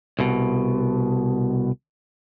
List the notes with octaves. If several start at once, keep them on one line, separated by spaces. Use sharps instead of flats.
C2 B2